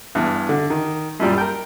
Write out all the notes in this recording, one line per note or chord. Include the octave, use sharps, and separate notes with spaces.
E2 G2
D3
D#3
F#2 A#2 G3
A#4 G5